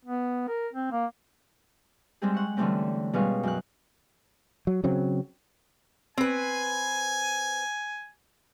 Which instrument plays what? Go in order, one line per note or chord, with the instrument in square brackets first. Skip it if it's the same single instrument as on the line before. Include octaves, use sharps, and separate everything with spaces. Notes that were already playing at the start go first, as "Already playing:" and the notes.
[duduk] B3
A#4
C4
A#3
[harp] G3 G#3 C4 G4 G#4
F#5 C#6
D3 E3 G3 A3 C4 C#4
B2 G3 G#3 C#4 F5 C#6
F#2 F#6
[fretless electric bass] F#3
C#3 F#3 C4
[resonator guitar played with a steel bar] C4 B4 [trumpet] G#5